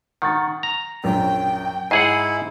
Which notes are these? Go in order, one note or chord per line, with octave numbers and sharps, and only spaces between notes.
D#3 F#5 C#6 A6
A#5
A#1 F#2 G5
G#2 E4 G#4 F#5 C7 D#7